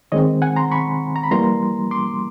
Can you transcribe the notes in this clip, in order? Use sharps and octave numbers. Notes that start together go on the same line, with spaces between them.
D#3 G#3 C4 C#5 D#5
F#5 G#5
A#5 C6
B5 C#6
A#5
B5
E3 G3 A#3 A#5 C6
C6 D6